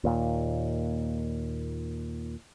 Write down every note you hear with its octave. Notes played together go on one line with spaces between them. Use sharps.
D#2 A#2